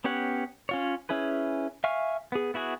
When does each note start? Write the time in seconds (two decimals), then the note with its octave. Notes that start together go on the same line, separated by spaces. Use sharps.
0.04 B3 C#4 G4 C#5 F#5
0.69 C#4 F4 C#5
1.09 C#4 E4 G#4 B4
1.84 E5 F5 G#5 C#6 F6
2.32 B3 G#4
2.54 B3 E4 F#4 G#4